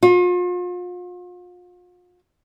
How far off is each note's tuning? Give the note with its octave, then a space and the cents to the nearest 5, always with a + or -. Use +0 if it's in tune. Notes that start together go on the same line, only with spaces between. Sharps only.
F4 +40